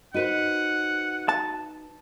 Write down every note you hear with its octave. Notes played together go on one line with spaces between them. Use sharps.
D#4 F#4 B4 C5 F#5 D#7
A5